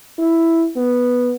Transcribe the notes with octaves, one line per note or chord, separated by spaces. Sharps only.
E4
B3